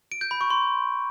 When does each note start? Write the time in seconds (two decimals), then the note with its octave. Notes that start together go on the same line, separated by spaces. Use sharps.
0.12 D7
0.21 G6
0.31 B5
0.41 C#6
0.50 C6